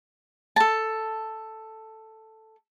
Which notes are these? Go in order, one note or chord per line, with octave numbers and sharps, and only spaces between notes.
A4 A5